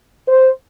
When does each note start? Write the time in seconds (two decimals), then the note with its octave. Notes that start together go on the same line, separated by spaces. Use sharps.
0.28 C5